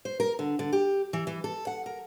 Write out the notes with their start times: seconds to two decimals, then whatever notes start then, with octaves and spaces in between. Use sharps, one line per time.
0.05 C5
0.20 A#4
0.39 D3
0.59 D3
0.73 G4
1.13 E3
1.27 E3
1.44 A4
1.67 F#5
1.86 A#4